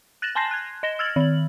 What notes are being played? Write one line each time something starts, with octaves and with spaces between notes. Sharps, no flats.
F#6 A6 A#6 E7 F#7
G#5 A5 C6 G6 A#6 C7
F#6 G#6
D#5 A#6 E7 G7
E6 F6 G#6 A6 F#7
D#3 F#7